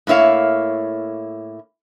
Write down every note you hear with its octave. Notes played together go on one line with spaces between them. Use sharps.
A2 A#3 E4 C#5 F5